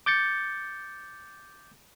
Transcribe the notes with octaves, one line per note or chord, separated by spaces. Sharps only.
D6 G6 A6 C#7